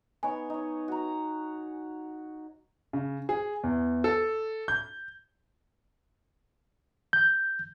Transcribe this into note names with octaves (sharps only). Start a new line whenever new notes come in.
B3 D#4 C#5 G#5
D#4 C#5
F#4 A#5
C#3
G#4
E2
A4
G6
G6